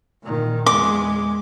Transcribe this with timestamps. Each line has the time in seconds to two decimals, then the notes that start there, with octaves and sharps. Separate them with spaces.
0.22 A#2 D#3
0.66 E2 G#3 D6